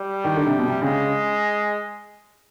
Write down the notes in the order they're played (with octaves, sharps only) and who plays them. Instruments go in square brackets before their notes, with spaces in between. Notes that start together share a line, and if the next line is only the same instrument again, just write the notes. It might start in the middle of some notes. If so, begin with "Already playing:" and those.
Already playing: [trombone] G3
[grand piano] D#3
D3
C3
B2
C3
[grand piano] C#3 [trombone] G#3